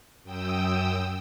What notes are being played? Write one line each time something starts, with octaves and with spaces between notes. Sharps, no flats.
F#2 G5 D#6 E6